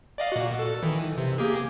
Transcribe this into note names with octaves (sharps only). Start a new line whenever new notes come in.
D5 D#5 F5
A#2 F#4
A4
D#3 E3
C3
A#3 G4 G#4